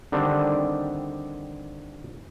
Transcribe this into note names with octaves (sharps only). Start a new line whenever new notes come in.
D3 D#3 G3 C4 D4